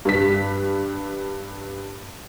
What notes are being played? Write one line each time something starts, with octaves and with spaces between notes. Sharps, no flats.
G2 B6